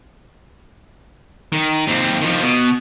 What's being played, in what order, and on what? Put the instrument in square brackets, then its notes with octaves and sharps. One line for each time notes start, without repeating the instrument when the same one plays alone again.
[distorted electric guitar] D#3
D#2 C4
D#3 F3
B2